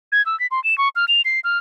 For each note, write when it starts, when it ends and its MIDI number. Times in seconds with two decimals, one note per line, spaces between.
0.12 0.25 92
0.26 0.38 88
0.40 0.47 95
0.51 0.62 84
0.64 0.77 100
0.78 0.89 85
0.96 1.05 89
1.08 1.21 101
1.25 1.40 96
1.44 1.58 89